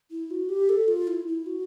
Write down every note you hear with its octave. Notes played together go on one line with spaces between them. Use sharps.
E4
F#4
G4
A4
F4
E4
E4
F#4